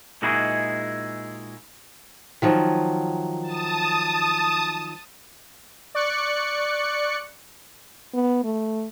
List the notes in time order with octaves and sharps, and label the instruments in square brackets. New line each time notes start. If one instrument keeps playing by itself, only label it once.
[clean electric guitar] A#2 G#3 D#4 E4 F#4 G#4
[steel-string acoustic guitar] D#3 F3 F#3
[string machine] A5 D#6
[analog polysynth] D5 C#6 F#6 C#7
[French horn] B3
A3